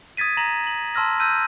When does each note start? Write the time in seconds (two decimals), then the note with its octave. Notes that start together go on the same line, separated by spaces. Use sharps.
0.17 D#6 G#6 A6 B6 D#7
0.37 A#5 A#6 E7 F#7
0.67 F#7
0.95 A5 C6 E6 F6 A#6
1.20 E6 F#6 G6 D#7